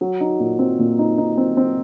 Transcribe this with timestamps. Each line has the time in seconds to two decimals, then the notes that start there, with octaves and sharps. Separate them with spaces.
0.01 F#3
0.21 D#4
0.40 A#2
0.59 C4
0.79 A#2
0.99 D#4
1.18 D#4
1.37 C4
1.57 C4